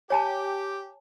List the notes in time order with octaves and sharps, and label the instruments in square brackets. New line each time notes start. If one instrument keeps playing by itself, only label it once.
[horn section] G4 [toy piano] C#5 G#5 A5